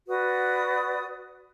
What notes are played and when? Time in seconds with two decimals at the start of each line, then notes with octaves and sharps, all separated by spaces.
0.08 F#4 B4 D5 D#6